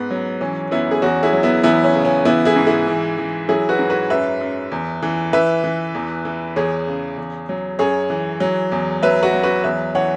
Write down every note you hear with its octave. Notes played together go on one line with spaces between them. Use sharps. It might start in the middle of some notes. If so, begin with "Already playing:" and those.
Already playing: G#2 B3
F#3
E3 C#4
F#2 B3 E4
G#4
E2 C#4 F#4
E4 G#4
F#3
B3 E4
E2 B3 E4
C#4
C#3
C#4
E3 B3 E4
E4 G#4
G#2
E4 G#4
E3
E3
F#3 E4 G#4
F#4 B4
G#2
F#4 B4
F#2 B4 E5
F#2
E2
E3
E3 B4 E5
E3
E2
E3
E2 G#4 C#5
C#3
E2
F#3
F#2 G#4 C#5
E3
F#3
E2
F#3 B4 E5
F#4 B4
F#3
F#4 B4
E2 B4 E5
E3 C#5 F#5